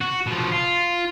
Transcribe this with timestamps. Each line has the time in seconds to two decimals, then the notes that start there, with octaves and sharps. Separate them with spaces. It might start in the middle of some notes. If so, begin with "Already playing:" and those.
0.01 F#4
0.27 B2 F3
0.52 F4